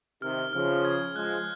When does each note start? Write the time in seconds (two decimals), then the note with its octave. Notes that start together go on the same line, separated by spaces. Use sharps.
0.22 C3 D#3 F6
0.53 C#3 F3 F6
0.85 G#6
1.15 F3 G#3 F#6